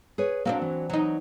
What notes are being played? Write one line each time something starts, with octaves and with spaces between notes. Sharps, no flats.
G#4 B4 C#5
F#3 A#3 C4 D4
E3
F#3 D#4